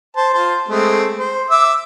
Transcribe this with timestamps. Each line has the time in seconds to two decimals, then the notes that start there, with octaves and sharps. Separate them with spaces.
0.17 C5 A5
0.34 F4 C5 A5
0.69 G#3 A3 C4
1.18 C5
1.50 E5 D6 E6